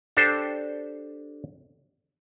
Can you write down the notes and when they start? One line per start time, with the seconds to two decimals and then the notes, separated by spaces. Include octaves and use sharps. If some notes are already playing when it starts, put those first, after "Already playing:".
0.17 D4 G4 A4 C5